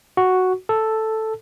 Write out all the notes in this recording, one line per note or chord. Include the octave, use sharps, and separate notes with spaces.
F#4
A4